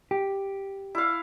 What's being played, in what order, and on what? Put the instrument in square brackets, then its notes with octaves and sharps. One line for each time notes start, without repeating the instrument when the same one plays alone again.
[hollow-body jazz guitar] G4
[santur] E4 F5